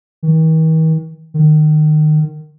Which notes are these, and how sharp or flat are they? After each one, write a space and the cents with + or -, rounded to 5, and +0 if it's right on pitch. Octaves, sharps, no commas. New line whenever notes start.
D#3 +45
D#3 -25